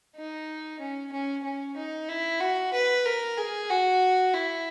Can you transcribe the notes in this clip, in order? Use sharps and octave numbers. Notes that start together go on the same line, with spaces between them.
D#4
C#4
C#4
C#4
D#4
E4
F#4
B4
A#4
G#4
F#4
E4